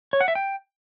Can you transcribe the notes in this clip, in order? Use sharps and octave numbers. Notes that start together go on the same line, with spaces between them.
C#5
F#5
E5
G5